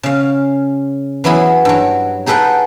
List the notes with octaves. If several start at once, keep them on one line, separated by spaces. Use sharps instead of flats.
C#3 F5
E3 F#3 B3 E4 G#4
G2 F#3
D#4 G#4 A4 B4 F#5 G5